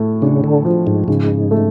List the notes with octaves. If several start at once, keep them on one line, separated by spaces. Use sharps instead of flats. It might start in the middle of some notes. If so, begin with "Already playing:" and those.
Already playing: A2 A3
C#3 D4
D3
F3
G#2
G#2 C#3
A3